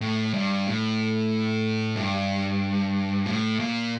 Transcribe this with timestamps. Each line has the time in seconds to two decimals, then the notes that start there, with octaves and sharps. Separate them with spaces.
0.01 A2
0.34 G2
0.67 A2
1.96 G2
3.26 A2
3.60 A#2